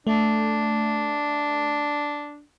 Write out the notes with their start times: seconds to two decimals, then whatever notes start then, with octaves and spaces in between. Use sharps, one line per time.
0.07 A3 D4